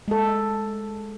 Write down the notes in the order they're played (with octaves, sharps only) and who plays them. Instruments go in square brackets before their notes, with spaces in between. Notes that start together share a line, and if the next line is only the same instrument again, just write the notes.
[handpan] G#3 A4